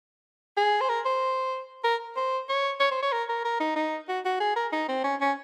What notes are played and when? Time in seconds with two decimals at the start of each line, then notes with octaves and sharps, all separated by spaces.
0.57 G#4
0.81 C5
0.89 A#4
1.05 C5
1.84 A#4
2.17 C5
2.49 C#5
2.80 C#5
2.91 C5
3.03 C#5
3.12 A#4
3.29 A#4
3.45 A#4
3.60 D#4
3.76 D#4
4.09 F#4
4.25 F#4
4.40 G#4
4.56 A#4
4.72 D#4
4.88 C4
5.04 C#4
5.21 C#4